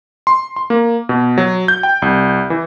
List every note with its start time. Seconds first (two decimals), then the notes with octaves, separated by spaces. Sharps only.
0.27 C6
0.56 C6
0.70 A#3
1.09 B2
1.38 F#3
1.68 G6
1.83 G5
2.02 C2
2.50 E3